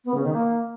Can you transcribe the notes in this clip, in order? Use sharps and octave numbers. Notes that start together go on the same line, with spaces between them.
B3
C#3
D#3
A#3